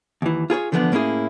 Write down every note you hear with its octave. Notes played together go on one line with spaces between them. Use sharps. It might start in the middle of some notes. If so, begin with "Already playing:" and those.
D#2 E3
F4 G#4 B4 C#5
D3 E3 F3 G3 B3 D4
A2 A#3 C#4 E4 G#4